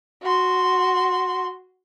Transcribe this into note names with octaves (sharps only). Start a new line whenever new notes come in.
F#4 C6